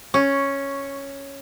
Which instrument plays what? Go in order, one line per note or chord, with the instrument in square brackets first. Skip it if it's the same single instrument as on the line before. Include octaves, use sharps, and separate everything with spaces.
[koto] C#4 [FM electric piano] C#6